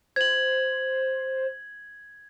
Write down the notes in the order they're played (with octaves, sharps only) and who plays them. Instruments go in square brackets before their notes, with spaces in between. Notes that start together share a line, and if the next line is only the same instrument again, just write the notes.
[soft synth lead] C5 [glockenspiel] G#6 F#7